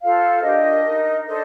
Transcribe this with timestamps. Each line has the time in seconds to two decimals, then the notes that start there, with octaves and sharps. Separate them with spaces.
0.03 F4 A4 C5 F5
0.43 D4 G4 A#4 D#5
0.86 D#4 A#4
1.27 D4 A4 C5 D#5